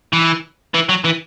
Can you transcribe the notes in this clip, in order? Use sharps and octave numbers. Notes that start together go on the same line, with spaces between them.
E3
E3
F#3
E3